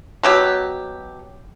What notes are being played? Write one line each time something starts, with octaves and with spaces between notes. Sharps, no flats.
B2 F#3 G4